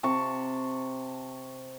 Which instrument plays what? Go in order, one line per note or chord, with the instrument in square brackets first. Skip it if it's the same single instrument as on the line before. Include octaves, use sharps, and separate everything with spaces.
[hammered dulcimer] C3 A5 C#6